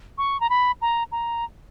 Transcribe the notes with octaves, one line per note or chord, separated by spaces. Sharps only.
C#6
A#5
B5
A#5
A#5